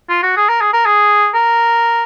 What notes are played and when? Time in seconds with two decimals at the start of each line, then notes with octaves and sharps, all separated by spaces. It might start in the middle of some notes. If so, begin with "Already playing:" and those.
0.09 F4
0.23 F#4
0.37 G#4
0.49 A#4
0.61 G#4
0.73 A#4
0.86 G#4
1.34 A#4